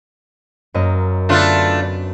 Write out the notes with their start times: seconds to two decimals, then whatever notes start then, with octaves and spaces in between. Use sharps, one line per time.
0.74 F#2 A#3 D#5
1.29 D3 A3 B3 D4 F4